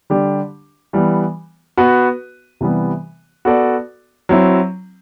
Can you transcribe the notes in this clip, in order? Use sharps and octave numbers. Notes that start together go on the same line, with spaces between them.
D3 G3 D4 G4
E3 G3 B3
B3 F#4 B4
C3 E3 G3 B3
B3 F#4 A4 D5
F#3 C4 E4